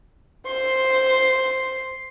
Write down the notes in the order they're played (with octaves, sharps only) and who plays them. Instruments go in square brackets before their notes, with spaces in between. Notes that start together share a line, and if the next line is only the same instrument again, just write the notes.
[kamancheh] C5 [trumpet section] C6